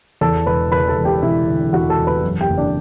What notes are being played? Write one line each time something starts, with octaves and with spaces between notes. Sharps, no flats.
E2 A4 A5
E1 B4 B5
E2 B4 B5
A4 A5
E1
G4 G5
E1 E4 E5
D3
E2 F#4 F#5
A4 A5
E1
B4 B5
F#2
G4 G5
F#1
D4 D5